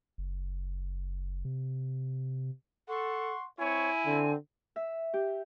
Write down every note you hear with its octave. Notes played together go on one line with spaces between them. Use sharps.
F#1
C3
A4 F#5 C6 C#6
C4 E4 C#5 G#5
D3 C4
E5
G4